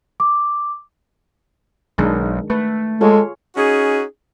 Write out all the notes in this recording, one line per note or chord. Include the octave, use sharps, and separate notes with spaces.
D6
B1 D#3 G#3 D4
A3 B4
G#3 F4 G#4 A4 C#5
C#4 D#4 F#4 G#4